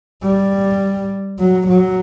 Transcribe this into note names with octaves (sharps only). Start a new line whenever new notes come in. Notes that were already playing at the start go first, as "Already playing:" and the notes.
G3
F#3
F#3